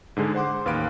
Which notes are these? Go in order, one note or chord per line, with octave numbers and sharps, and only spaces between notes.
G#2 D3 G#3 G#4
C5 F#5 C6 D6
A1 D#2 B4 F5 B5 D7